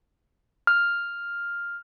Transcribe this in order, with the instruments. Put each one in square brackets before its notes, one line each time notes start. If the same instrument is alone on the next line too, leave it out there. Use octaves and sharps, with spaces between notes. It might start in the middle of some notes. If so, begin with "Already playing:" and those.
[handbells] F6